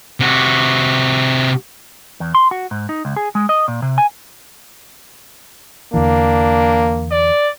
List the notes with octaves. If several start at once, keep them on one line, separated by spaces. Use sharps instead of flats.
C3 F#4
E2
C6
F#4
G#2
D#4
C#2
G#4
G#3
D#5
A#2
C3
G#5
E2 D3 E3 A#3 D4
D5